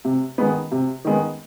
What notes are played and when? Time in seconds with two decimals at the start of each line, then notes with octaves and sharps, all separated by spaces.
0.05 C3
0.38 D#3 G#3 B3
0.71 C3
1.05 D#3 G#3 B3